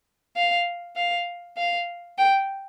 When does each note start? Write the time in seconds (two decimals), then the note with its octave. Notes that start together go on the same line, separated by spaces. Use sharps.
0.36 F5
0.96 F5
1.57 F5
2.18 G5